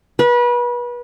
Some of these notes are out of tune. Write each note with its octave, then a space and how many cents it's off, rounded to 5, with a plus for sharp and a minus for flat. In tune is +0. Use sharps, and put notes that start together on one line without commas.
B4 -30